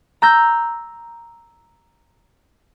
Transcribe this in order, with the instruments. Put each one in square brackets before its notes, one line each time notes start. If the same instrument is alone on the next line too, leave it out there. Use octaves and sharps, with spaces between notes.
[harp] A#5 E6 G6 A#6